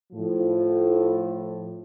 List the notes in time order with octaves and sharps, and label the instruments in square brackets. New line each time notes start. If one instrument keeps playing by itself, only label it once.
[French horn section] A2 F3